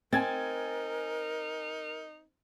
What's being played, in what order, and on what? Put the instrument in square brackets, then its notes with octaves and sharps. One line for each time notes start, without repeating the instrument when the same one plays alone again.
[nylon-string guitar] C4 [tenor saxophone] D#4 [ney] A#4 [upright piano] G#5 G#6 A6